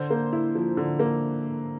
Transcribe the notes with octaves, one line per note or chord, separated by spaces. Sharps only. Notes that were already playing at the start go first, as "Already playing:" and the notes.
Already playing: D3 C5
A#3
E4
F3
D3
A#3